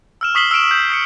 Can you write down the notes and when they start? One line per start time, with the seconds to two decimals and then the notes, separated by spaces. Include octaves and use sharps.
0.21 E6 F6 E7
0.35 C#6 D#6 B6 C7 F#7 G7
0.51 E6 F6 D7 E7
0.71 E6 G6
0.90 D#6 B6 C#7